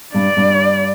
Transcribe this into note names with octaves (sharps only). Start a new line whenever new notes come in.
G2 D5
G2